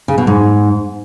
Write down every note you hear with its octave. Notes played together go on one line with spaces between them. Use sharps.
C#3
B2
G#2